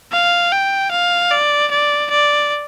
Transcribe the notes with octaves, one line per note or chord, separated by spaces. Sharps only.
F5
G5
F5
D5
D5
D5